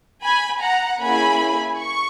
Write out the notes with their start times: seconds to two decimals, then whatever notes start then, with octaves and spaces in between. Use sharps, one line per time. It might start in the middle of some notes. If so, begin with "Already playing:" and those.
0.23 G#5 B5
0.62 F#5 A#5
1.00 A#3 C#4 E4 G#4 G#5 B5
1.79 C#6